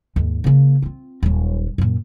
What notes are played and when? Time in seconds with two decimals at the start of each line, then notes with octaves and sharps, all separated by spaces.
0.16 D#2 G#2
0.44 C#3 A#3
0.82 C4 F4
1.23 D#1 F#3
1.78 F#2 A#2